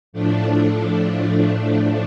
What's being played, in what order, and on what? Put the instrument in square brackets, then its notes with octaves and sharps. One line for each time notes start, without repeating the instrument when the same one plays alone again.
[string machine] A2 F3 A3 D4